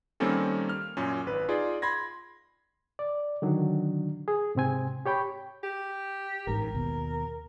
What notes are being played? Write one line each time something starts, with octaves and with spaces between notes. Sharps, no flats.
D#3 G3 A#3 C4 C#4 A4
F6
F#2 A#2 C#4
G#1 B4
D#4 F4 G#4 D5
B5 C6 G#6 A#6
D5
D3 D#3 F#3 D4
G#4
G#2 C3 C4 G#5
G4 C#5 G5 B5
G4
A1 G#2 A#4
D#2 B2